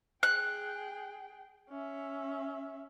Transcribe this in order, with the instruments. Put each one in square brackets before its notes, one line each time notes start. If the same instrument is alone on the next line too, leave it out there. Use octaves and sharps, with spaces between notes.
[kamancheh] G#4 G5 [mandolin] F#6
[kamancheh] C#4 E5